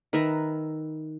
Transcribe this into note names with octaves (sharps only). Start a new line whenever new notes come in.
D#3 B4 E5 A#5